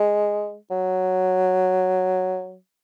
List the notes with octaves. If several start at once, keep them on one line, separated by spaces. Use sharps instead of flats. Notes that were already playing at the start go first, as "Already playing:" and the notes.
Already playing: G#3
F#3